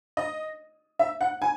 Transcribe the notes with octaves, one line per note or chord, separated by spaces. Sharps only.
D#5
E5
F#5
G#5